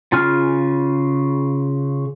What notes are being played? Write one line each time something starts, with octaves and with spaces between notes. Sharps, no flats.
C#3 F4 G#5 F6